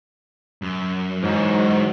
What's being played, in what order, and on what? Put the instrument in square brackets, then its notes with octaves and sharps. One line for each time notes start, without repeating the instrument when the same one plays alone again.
[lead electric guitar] F#2
[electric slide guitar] G#2 [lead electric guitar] E3 D#4 [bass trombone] F#3